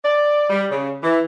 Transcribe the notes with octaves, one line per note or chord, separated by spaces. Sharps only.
D5
G3
C#3
E3